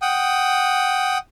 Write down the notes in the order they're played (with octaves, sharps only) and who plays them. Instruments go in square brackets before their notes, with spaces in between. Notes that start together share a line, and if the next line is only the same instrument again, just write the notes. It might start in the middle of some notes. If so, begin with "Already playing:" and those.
[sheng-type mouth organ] F#5 G5 D#6